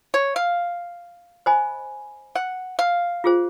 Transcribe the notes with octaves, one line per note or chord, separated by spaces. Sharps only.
C#5
F5
C5 D#5 G#5 B5
F#5
F5
F4 G#4 C5